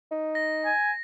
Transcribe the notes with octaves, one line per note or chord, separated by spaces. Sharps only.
D#4
A#6
G#5